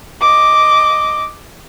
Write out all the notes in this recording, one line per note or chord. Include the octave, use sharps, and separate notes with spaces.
D#5 D6